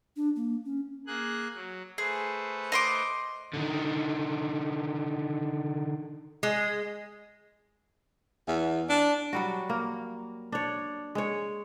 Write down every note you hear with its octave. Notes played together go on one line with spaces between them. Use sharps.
D4
A#3
C#4
A#3 G#4 F#6
F#3
A3 G#4 B4 C5
D#5 C6 D6
D3 D#3
G#3
E2
D4
F#3 G3 F#4
A#3
D4 C#5
G#3 C#5